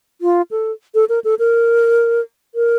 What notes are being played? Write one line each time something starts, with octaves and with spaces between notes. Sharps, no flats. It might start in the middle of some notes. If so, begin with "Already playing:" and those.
F4
A4
A4
A#4
A4
A#4
A#4